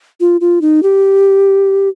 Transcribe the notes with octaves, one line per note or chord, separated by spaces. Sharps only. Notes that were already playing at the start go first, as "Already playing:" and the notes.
F4
F4
D#4
G4